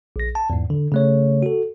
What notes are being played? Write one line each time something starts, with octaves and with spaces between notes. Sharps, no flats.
A#1 A#6
A5
E2 G#2
D3
C#3 A3 C#5
F#4 A4